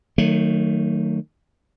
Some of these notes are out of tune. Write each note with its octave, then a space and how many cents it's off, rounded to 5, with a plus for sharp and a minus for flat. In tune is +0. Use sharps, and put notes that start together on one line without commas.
D#3 -15 F#3 +0 A3 +30